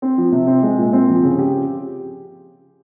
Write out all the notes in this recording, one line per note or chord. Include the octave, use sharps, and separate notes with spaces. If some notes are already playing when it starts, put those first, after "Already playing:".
C4
F3
C3
C4
G#3
A#2
C4
F3
C#3
G4